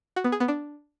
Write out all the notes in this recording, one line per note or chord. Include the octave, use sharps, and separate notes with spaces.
F#4
B3
G#4
B3
D4